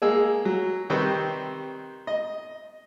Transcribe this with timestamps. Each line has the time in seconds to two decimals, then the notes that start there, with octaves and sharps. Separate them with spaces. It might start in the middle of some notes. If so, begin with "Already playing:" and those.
0.02 G#3 A#3 G#4 E6
0.45 F#3
0.90 C3 D#3 G3 C4 B4 C#6
2.07 D#5